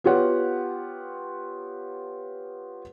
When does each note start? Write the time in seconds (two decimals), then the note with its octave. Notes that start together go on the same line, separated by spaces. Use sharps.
0.04 B3 F4 G4 C#5 F#5